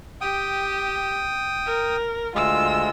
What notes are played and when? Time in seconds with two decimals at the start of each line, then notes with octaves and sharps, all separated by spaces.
0.21 G4 G5 D#6
1.66 A#4
2.35 D2 G#3 F4 E6